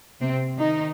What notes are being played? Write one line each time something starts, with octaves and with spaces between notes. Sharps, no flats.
C3 C4
D#3 D#4